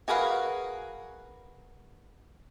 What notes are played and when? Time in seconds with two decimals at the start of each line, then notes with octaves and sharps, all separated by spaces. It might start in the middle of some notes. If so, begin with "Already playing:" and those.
0.08 F#4 G#4 A#4 B4 F5